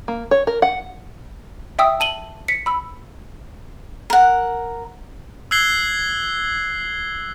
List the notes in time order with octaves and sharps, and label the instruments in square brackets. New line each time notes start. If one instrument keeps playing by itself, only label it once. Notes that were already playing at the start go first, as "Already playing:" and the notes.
[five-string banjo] A#3
C#5
A#4
F#5
[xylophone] E5 G5 D#6 E6
A5 D#7 F#7 G7
B6 C#7
B5 E6
[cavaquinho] A#4 F#5
[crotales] E6 F#6 G#6 C7 G7